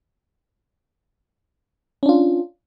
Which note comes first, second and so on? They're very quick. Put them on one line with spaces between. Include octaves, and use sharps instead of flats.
C#4 D4 F4